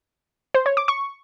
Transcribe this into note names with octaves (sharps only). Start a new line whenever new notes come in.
C5
C#5
D6
C#6